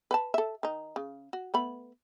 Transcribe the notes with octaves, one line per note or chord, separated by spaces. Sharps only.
B4 F#5 A5
A4 E5
D#3 D#4
C#3
F#4
A3 B3 B5